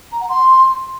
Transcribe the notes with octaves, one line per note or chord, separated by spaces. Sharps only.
A#5
F#5
C6